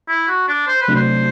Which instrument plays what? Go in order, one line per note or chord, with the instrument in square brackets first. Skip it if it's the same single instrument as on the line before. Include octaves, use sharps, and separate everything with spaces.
[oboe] E4
F#4
D4
C5
B4
[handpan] C3 F#3 A3 D4
[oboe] C5